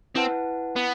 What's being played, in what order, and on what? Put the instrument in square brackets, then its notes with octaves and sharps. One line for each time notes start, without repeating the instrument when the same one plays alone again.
[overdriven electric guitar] C4 [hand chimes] E4 B4 F#5 A5
[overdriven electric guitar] B3